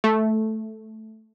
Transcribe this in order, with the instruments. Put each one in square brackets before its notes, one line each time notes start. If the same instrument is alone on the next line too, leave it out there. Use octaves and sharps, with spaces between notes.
[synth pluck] A3